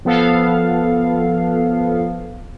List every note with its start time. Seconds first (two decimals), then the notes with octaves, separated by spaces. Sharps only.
0.05 F3 B3 A4 F5